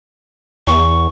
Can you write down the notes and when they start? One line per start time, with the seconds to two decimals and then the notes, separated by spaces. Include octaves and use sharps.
0.67 E2 C#6